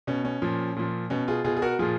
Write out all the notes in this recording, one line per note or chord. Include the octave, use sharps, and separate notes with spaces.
B2 C#4
C#4
A#2 F3
A#2 F3
B2 C#4
F4 G#4
B2 F4 G#4
G#4
F#4 A#4
A#2 F3 F4 G#4